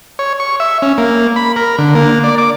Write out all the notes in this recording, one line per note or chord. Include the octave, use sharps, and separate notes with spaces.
C#5
C#6
E5
C#4
A#3
B5
A#4
D3
A#3
D5
D6